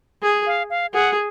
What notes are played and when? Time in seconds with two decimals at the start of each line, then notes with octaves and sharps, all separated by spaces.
0.23 G#4
0.46 F5
0.70 F5
0.94 G#4 F#5